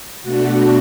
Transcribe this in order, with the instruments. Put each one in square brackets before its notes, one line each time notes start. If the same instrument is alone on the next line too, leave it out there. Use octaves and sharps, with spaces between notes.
[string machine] B2 A3 D4 F#4